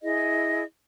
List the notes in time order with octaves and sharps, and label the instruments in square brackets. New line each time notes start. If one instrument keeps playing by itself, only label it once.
[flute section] E4 G#4 D#5